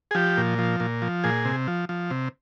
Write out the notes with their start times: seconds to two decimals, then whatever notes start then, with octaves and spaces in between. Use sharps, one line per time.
0.11 G#4
0.15 F3 G4
0.37 A#2
0.58 F3
0.80 A#2
1.02 F3
1.24 A#2 G#4
1.45 C3
1.68 F3
1.89 F3
2.10 C3